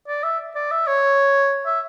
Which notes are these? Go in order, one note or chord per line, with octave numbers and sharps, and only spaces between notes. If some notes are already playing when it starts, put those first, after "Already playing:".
D5
E5
D5
E5
C#5
E5